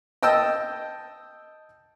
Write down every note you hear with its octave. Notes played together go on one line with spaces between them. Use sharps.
D#5 G5 A5 E6